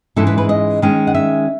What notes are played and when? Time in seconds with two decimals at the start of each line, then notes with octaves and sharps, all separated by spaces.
0.16 G#2 E3 G#3 C#4 E4 A4
0.27 B4
0.38 B4
0.49 D#5
0.82 D#3 G#3 C#4
1.07 F#5
1.15 E5